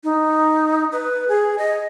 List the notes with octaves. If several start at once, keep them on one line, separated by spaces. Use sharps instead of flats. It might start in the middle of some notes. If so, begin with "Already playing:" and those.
D#4
B4
G#4
D#5